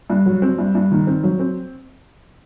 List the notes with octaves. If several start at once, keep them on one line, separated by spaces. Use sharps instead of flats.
G2
F#3
C4
G2
G2
D#3
C4
F#3
C4